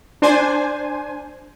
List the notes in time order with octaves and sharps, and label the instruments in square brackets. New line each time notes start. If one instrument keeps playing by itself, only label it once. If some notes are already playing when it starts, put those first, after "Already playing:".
[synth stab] D4 C5 G#5